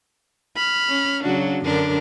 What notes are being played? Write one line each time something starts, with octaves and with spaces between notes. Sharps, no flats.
B5 F6
C#4
C#3 F#3 D4 F#4
F#2 D3 D4 A#4